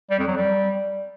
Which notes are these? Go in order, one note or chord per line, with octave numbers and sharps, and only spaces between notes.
G3
F2
F#3
G3